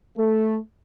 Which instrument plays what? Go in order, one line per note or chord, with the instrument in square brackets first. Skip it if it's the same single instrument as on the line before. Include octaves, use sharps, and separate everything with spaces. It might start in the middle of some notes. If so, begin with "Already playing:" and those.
[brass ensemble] A3